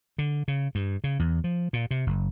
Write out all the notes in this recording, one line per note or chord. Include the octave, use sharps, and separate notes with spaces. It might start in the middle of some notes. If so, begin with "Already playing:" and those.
D3
C#3
G2
C#3
E2
F3
A#2
C3
F#1